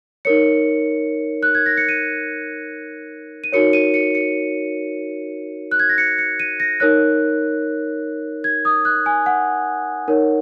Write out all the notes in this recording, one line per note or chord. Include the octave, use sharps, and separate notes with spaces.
D#4 A#4 C#5 C#7
F#6
G#6
A#6
C#7
D#7
D#7
D#4 F#4 A#4 C#5 C#7
D#7
C#7
C#7
F#6
G#6
A#6
C#7
C#7
D#7
A#6
D#4 A#4 C#5 F#6
G#6
D#6
F#6
G#5
F#5
D#4 A#4 C#5